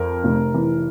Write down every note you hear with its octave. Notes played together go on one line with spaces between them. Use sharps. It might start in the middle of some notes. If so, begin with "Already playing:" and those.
Already playing: F2 A#4
F1
E3